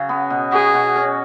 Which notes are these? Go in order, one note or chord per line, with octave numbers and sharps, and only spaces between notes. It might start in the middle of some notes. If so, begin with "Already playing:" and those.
Already playing: C#3 F#3 F#4
B3
B2
F#4 G#4
B2
C#4